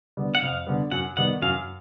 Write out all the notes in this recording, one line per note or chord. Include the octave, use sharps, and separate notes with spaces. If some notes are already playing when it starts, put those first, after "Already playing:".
D3 G3 B3
F#5
F2 F5
D3 G3 B3
F#2 F#5
D#3 G3 B3 F#5
F#2 F5